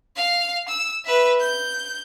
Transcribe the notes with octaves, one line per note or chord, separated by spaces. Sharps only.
F5
E6
B4 E5
G6